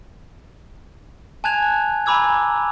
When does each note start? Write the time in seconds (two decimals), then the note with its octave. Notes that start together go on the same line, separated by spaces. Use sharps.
1.44 G#5 A5 F#6 G#6 F7
2.06 G#5 A#5 B5 D6 E6 G#6